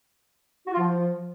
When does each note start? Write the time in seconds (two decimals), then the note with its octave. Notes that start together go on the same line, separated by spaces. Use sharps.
0.67 F#4
0.73 F4
0.79 F3